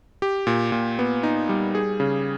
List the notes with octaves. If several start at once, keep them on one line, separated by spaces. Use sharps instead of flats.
G4
A#2
A#2
B3
D#4
G3
G#4
C#3